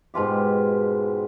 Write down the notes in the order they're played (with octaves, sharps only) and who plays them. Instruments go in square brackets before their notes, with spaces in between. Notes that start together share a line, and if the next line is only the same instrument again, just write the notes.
[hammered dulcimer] G#2 B2 F4 G4